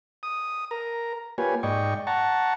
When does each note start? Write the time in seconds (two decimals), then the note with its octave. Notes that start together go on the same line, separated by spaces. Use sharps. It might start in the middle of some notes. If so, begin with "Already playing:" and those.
0.23 D#6
0.71 A#4 A#5
1.38 A#3 F4 G4 B4 C#5 G#5
1.63 G#2 D5 D#5 G5 C#6
2.07 F#5 A5 A#5 C#6